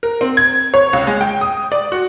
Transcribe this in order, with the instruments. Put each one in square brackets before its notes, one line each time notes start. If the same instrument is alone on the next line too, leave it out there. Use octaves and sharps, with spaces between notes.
[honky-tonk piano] A#4
C4
G#6
C#5
C#2
G#3
G5
D#6
D5
F#4